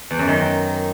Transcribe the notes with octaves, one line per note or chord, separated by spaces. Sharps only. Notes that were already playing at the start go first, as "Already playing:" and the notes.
E2
F#2
D#3